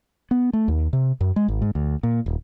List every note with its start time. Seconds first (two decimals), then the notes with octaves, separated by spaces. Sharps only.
0.31 B3
0.53 A3
0.68 D#2
0.93 C3
1.21 F#2
1.36 G#3
1.48 G#1
1.62 G#2
1.75 D2
2.03 A#2
2.26 D#1